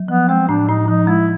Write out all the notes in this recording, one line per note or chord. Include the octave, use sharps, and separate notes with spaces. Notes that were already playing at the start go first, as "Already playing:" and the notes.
Already playing: F#3
F3 B3
G#3 C4
A2 D4
A2 D#4
F3 D#4
G#3 E4